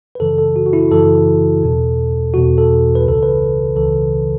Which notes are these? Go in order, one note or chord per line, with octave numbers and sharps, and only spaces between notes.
B4
F#2 C#3 E3 A4
A4
F#4
F#4
E4
F#2 C#3 E3 A4
E2 B2
E2 B2 F#4
A4
B4
C#2 C#3 E3 A4
B4
C#2 C#3 E3 A4